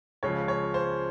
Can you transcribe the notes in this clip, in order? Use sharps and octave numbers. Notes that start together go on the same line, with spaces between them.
C#2 C#3 F3 C#5
C#5
C5